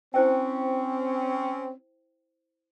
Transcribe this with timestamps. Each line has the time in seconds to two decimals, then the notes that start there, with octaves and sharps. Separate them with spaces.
0.14 C4 C#4 E4 C5 G5